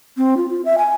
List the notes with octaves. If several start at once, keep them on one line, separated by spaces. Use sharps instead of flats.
C4
F4
F4
E5
G#5